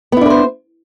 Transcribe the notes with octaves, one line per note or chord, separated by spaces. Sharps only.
B3 D4 E4 B4 C5